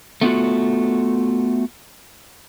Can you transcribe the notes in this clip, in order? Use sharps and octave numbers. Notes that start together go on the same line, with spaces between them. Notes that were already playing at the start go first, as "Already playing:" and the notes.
A3 B3 F4 F#4